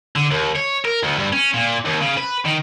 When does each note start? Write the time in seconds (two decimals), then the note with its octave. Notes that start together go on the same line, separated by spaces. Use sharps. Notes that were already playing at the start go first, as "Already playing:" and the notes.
0.16 D3
0.31 D#2
0.56 C#5
0.85 A#4
1.03 D2
1.19 G2
1.33 C#4
1.54 A#2
1.85 D#2
2.00 C#3
2.17 B4
2.45 D#3